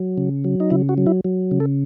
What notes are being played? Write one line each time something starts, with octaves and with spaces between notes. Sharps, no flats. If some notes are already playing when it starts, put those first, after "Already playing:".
Already playing: F#3
C#3
F#3
D#4
C#3 E4
F#4
F#3
E4
F#3
C#3
A4